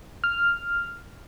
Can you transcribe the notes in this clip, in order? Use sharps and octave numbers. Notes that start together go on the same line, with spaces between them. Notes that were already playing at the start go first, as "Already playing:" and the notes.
F6